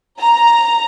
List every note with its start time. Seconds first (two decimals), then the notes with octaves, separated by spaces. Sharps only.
0.19 A#5